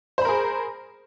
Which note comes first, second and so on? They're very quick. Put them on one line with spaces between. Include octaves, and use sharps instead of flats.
C5 B5 A#4 G#4